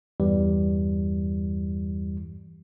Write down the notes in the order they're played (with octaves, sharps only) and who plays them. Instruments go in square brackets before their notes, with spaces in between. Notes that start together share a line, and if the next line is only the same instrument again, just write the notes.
[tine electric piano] E2 G2 E3 G3